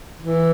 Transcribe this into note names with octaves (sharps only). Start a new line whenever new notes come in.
E3